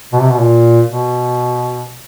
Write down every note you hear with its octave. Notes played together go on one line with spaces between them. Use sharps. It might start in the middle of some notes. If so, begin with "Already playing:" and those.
B2
C3
B2
A#2
B2